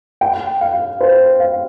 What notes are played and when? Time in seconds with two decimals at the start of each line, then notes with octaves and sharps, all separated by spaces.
0.21 G5
0.61 F5
1.00 C5
1.40 F5